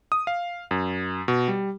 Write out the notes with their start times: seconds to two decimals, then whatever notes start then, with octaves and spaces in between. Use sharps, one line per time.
0.12 D#6
0.27 F5
0.71 F#2
1.28 B2
1.48 G3